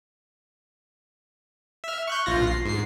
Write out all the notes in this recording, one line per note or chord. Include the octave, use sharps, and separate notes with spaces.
E5 F6
C#6 F#6 G6
A#1 F4 A#6
C7
G#2 C7